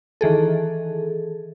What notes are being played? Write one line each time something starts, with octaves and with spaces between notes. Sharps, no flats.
D#3 E3 G#4 A4